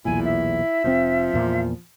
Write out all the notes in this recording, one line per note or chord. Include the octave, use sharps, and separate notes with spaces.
B1 E2 A#2 E4 G#5
E5
F1 G#2 F3 C4
E2 A#2